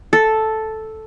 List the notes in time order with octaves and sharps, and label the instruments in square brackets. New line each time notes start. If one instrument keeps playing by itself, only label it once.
[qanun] A4